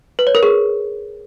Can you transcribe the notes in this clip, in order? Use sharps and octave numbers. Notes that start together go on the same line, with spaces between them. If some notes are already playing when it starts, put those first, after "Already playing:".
B4
C#5
A#4
G#4